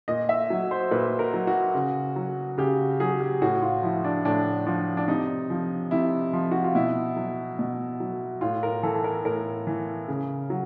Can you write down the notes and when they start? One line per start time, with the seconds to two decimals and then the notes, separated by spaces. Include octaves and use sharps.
0.08 A#2 D#5
0.29 E5
0.50 F#3
0.71 C5
0.91 A#2 B4
1.19 A#4
1.34 F#3
1.47 F#4
1.75 C#3
2.16 F#3
2.58 C#3 G4
3.00 F#3 G#4
3.20 G4
3.42 A2 F#4
3.62 F4
3.83 F3 E4
4.04 D4
4.25 A2 D4
4.66 F3 D4
4.97 D4
5.08 C3 D#4
5.50 F3
5.91 C3 E4
6.33 F3
6.52 F#4
6.64 F4
6.75 B2 E4
7.16 F#3
7.59 B2
8.00 F#3
8.41 A2 F4
8.63 A#4
8.83 E3 A4
8.95 A4
9.04 A#4
9.25 A2 A#4
9.67 E3
10.08 C#3
10.50 F#3